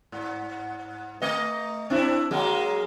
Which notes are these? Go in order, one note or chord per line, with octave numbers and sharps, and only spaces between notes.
G#2
A3 D#5
C4 D4 E4
F#3 G#3 A#3